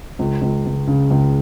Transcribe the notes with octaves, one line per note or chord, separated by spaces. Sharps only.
C#2
C#2
C#2
C#3
C#2